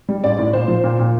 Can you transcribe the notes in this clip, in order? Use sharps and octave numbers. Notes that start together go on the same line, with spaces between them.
G3
A1 D5
A2
A#2 C5
F3
A#2
A#2